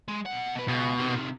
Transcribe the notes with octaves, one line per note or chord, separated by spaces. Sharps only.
G#3
B2 F#5
B2 B4
C#2 B2
C3 D#3